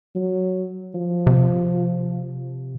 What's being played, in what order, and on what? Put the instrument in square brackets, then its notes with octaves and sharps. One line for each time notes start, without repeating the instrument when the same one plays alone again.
[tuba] F#3
F3
[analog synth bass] C3